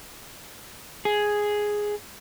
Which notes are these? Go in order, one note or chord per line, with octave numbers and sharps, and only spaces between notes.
G#4